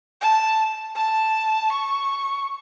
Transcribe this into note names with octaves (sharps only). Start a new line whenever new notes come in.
A5
A5
C#6